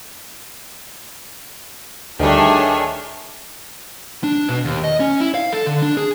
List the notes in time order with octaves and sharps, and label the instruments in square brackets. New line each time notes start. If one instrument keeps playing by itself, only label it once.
[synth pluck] D2 G3 [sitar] D#3 A3 [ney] D4 [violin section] G#4 C#5 E5
[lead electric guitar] D4
B2
D#2
D#5
C#4
E4
F5
A4
D3
D4
G#4